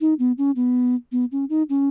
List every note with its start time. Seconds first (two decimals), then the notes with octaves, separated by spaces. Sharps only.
0.01 D#4
0.19 B3
0.38 C#4
0.56 B3
1.12 B3
1.32 C#4
1.50 D#4
1.69 C#4